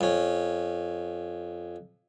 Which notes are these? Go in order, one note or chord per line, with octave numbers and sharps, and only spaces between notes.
F2 C#4